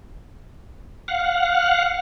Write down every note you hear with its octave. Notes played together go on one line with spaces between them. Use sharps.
F5 F#5